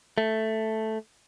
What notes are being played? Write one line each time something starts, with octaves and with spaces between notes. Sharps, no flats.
A3